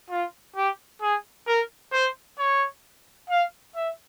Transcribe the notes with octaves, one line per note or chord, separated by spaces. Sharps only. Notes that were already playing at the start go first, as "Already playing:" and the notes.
F4
G4
G#4
A#4
C5
C#5
F5
E5